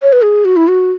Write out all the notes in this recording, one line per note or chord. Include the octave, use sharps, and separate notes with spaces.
C#5
B4
G#4
F#4
E4
F#4